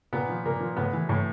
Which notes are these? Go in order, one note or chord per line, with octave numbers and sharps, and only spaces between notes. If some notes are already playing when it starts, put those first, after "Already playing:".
A#2 B3
F3
A#2 A#3
F3
A2 B3
E3
A2